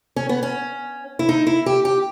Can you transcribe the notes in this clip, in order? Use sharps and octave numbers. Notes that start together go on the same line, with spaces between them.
C#4
B3
C#4
E4
D#4
E4
G4
G4